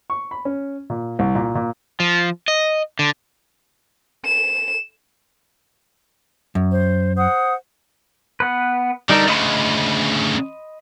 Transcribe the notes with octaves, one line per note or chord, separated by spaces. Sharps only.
C#6
B5
C#4
A#2
C2
A#2
A#2
F3
D#5
D3
E7
F#2
C5
C5 F#5 D#6
B3 B4
D3 G3 A3 D#4 A#4
D2 C#3 D#5 B5 C6